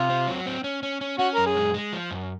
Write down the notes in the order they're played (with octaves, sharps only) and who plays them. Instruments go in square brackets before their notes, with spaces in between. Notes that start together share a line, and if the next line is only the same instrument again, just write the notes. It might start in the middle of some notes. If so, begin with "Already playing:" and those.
Already playing: [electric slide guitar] C3 [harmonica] F4
[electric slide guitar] C4
F#3
C4
C#4
C#4
C#4
[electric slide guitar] C#4 [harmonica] F#4
[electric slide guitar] F#2 [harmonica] A#4
[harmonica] G#4
[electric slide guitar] G#3
G#3
F3
F#2